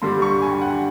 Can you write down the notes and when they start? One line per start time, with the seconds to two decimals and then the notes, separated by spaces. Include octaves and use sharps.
0.02 G2 D3 G3 C6
0.22 C#6
0.42 G#5
0.52 G5
0.61 F#5